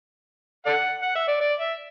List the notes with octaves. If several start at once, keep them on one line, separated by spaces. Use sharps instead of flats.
A4 D5 F#5
F#5
E5
D5
D5
E5